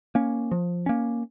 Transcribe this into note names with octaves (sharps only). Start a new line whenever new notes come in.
A#3 C#4
F3
A#3 C#4